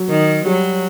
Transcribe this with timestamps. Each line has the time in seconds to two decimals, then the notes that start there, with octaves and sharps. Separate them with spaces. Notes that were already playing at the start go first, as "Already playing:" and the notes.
Already playing: F#3
0.10 D#3
0.46 F#3 G3